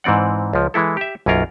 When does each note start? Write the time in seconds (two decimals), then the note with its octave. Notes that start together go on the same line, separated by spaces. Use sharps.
0.04 G#2 E3 C4 D5 F#5
0.53 C#2 F3
0.74 E3 G#3 E4 A4
0.97 G4 E5
1.26 B1 F#2 A#3 C#4 F4 A#4